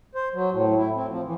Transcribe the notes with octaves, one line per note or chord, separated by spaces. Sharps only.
C5
F#3
A2
E4
C4
F3
E3